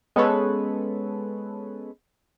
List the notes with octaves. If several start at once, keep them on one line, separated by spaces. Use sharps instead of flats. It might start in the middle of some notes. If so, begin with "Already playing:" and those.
G#3 B3 C#4 A4 B4 C#5